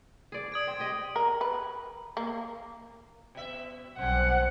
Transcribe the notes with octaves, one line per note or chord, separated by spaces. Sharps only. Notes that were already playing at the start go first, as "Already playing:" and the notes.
G#4 D5
D#6 G#6 D7
C4
G4 D#5
A#4
B4
A#3
B2 E5
B1 G3 C4 F#5